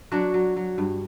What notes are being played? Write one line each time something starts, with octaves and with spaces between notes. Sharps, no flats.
F#3 D4 F#4
F#3
F#3
G2